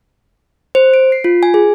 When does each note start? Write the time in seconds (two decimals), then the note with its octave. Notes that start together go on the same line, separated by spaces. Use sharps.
0.75 C5
0.94 D7
1.12 C7
1.24 F4
1.43 G#5
1.54 G#4